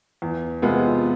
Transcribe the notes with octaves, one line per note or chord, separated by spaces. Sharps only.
E2
C3 G#3 B3 F4